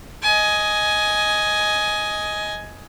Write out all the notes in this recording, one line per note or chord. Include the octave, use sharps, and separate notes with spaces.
D#5 G#5